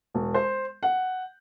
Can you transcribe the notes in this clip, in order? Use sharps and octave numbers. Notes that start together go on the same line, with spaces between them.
E1
C5
F#5